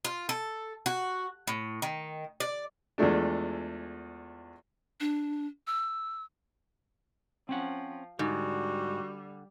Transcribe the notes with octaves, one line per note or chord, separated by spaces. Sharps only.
F4
A4
F#4
A2
D#3
D5
E2 F3 G#3 A3 D4
D4
E6
F3 C4 C#4 F#5
G#2 D3 G3 F#4